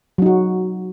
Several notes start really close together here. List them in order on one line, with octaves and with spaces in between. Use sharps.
F#3 D#4 F#4